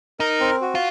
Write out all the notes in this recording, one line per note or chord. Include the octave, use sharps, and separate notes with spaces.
D#4 A#4
C4
F#4
F4